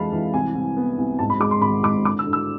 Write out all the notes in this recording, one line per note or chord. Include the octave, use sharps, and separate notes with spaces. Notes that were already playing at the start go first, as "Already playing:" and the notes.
Already playing: F2 E3 G#3 F5 A5 B5
E3
C2 G#5
C2
B3
C2
G#2 A5
B5
G#3 D6
C6
G#1 B5
G#2 D6
D3 D6
E6
D3
E6